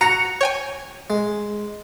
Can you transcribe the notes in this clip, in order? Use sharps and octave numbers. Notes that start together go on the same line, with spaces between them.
F#4 A#5 A#6 C#7 F7
C#5 G5 G#5
G#3